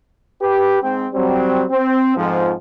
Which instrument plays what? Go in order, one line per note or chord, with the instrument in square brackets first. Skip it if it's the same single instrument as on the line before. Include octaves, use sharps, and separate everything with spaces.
[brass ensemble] G4 B4
G#2 C4 G5
F#3 G3 C4
C4
F2 G#2 F3